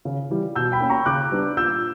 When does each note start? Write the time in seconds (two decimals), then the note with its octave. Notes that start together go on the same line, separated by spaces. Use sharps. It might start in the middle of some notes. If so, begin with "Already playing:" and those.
0.05 C#3
0.30 E3 G3
0.55 B2 E6 G6
0.72 G5 B5
0.80 A#3 C#4
0.90 A#5 C#6
1.06 C#3 D6 F#6
1.31 G3 B3 D4
1.57 A#2 E6 G6